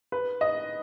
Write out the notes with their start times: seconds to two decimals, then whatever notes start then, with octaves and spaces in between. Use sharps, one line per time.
0.12 B4
0.41 D#5